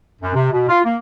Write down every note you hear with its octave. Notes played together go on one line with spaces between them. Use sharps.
F#2
C3
B2
F4
A#3